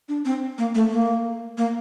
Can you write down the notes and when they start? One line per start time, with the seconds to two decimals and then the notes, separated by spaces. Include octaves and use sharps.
0.08 D4
0.25 C4
0.58 A#3
0.75 A3
0.91 A#3
1.57 A#3